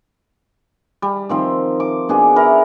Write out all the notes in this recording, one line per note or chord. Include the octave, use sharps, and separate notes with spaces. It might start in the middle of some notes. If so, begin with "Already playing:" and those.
G3
D#3 F3 C4
D6
B2 D4 G#4
E4 A#4 F#5